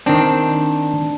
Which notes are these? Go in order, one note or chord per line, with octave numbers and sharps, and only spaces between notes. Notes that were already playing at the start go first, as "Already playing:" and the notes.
D#3 C4 D4